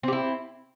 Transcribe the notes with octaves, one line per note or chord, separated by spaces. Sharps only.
C4 E4 G4